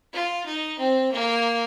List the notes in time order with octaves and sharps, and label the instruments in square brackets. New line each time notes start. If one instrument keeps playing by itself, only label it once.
[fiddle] F4
D#4
C4
A#3